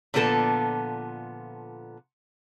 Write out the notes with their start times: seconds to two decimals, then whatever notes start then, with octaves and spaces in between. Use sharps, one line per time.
0.14 A#2 D3 F3 B3 A4 A5